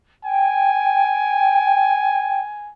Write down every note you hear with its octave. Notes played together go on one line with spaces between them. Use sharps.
G5 G#5